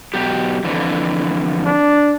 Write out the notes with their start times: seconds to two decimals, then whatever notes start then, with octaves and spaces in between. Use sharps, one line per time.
0.14 B2 F#3 G4
0.64 F2 D3 E3
1.65 D4